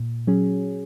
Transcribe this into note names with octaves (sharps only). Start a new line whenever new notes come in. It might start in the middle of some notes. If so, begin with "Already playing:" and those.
Already playing: A#2
F#3 C#4 G#4